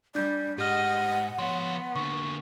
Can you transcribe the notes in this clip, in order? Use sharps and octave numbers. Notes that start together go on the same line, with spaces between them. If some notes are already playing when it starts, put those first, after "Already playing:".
G3 D4 D5 G6
G#2 G4 D#5 F#5 F6
F3 B3 C#5 C6
D3 A#3 C#6